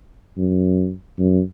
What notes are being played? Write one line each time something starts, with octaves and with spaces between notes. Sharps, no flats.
F#2
F#2